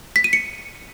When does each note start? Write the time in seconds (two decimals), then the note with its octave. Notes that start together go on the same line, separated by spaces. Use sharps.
0.16 B6
0.24 D#7
0.33 C#7